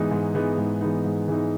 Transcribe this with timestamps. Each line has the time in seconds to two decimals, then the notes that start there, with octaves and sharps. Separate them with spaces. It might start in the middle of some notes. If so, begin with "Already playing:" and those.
Already playing: G#2 E3 G#3 B3 D#4
0.11 G#2
0.34 E3 G#3 B3 D#4
0.58 G#2
0.81 E3 G#3 B3 D#4
1.05 G#2
1.28 E3 G#3 B3 D#4